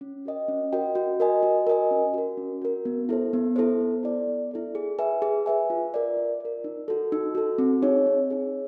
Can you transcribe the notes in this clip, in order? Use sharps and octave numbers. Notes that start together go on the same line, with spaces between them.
C#4
F#4 A#4 D#5 G5
C#4
F#4 A#4 D#5 G5
F#4
A#4 D#5 G#5
F#4
A#4 D#5 G#5
C#4
F#4 A#4
C#4
F#4 A#4
B3
E4 A4 C5
B3
E4 A4 C5
B3
E4 A4 D5
B3
E4 A4 D5
G#4
B4 E5 G#5
G#4
B4 E5 G#5
F4
A#4 D5
F4
A#4 D5
D#4
F#4 A4
D#4
F#4 A4
C4
D#4 G#4 C#5
C4
D#4 G#4 C#5